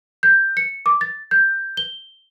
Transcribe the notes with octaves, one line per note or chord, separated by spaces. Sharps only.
G6
C#7
D6
A6
G6
G7